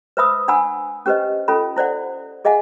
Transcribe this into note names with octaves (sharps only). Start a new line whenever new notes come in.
B4 C5 E5 B5 D#6 E6
D4 F#5 G#5 B5 E6
C#4 G4 B4 C5 D#5
C#4 F4 A4 B5
E4 C5 D5 F#5
G#4 D#5 E5 F#5 G#5